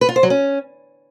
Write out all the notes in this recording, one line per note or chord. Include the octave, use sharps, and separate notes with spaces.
B4
F4
C5
F#3
C#4